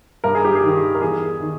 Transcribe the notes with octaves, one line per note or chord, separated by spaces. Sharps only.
G2 A#4
G#4
G4
G#4
D#3
A#4
E2 G#4
D#3